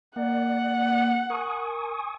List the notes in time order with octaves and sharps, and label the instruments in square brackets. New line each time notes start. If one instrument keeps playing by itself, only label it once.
[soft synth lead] A#3 [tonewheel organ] D5 [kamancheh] F#5
[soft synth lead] A#4 [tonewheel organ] G#5 C#6 D#6